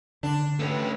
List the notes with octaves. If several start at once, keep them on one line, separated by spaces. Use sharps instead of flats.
D3 D4
A3 C#4 F#4 G4 B4